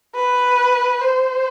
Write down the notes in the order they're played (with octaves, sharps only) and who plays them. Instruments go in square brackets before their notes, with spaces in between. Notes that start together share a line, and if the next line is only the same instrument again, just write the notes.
[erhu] B4
C5